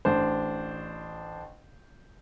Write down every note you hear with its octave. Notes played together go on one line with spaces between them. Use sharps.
A1 D4 C5